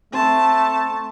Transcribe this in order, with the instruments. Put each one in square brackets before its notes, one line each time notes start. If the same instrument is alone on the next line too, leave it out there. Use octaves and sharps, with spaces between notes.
[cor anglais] A3 [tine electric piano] C4 C6 [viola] A5